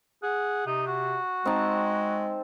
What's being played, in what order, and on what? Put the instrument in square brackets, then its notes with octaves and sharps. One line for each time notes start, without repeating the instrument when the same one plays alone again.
[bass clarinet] G#4 [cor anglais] F#5
[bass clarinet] C3 [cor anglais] D#4
[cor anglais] F#4
[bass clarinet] G#3 [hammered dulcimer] C4 D#4 A5